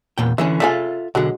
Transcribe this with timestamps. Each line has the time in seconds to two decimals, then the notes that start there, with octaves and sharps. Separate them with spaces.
0.18 E2 A#2 G5
0.38 D3 E3 C#4 E5
0.60 C#3 D4 F4 A4 E5 G#5
1.15 B1 D3 F#3 G#3 F#4